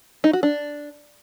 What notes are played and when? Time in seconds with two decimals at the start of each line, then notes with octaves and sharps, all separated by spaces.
0.24 D#4
0.33 F#4
0.43 D4